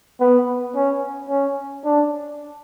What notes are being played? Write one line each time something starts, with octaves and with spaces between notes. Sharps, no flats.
B3
C#4
C#4
D4